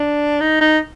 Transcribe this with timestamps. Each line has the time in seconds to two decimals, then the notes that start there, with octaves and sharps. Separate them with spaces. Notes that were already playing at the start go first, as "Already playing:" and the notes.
Already playing: D4
0.40 D#4
0.61 D#4